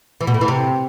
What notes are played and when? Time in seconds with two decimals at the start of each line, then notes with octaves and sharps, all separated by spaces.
0.21 E3
0.27 B2
0.34 A2
0.41 E3
0.48 C3